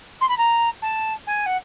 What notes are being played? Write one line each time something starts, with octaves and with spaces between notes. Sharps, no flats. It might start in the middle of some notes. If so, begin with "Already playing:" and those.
C6
B5
A#5
A5
G#5
F#5